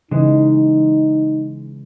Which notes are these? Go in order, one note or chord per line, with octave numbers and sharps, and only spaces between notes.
C#3 E3 G#3 D#4